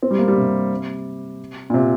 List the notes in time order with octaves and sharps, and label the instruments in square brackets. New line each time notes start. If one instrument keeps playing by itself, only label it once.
[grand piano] C4
G3
A#3
G3
C3
A#2
C3